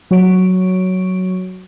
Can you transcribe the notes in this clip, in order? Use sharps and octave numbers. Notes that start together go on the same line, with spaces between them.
F#3 F#4 C#5 C#6 D7